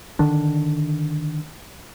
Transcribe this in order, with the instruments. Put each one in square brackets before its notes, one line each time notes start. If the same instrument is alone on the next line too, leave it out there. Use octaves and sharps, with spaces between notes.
[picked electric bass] D3 D#3 D4